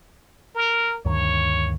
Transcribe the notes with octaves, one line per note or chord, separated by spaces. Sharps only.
A#4
D2 G2 D#3 C#5